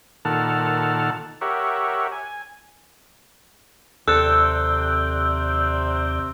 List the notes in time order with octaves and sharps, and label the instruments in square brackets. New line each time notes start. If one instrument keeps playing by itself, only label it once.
[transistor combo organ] A#2 D#3 A4 F#5 A5 F6
G4 A#4 C#5 E5 F#5
G#5
[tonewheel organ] D#2 D5 G6 [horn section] C3 C4 [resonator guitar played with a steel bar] A4 [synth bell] E6 F#6